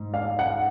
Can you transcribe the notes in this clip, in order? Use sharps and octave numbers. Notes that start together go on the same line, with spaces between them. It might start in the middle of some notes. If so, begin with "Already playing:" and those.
Already playing: G#2
F5
F#5